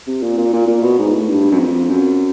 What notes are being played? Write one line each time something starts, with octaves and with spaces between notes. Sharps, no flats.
C3
A#2
A#2
A#2
A#2
B2
G#2
A2
G2
F#2
F2
F#2